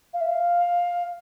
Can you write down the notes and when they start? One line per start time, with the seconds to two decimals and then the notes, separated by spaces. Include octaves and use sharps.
0.14 F5
0.21 E5
0.28 F5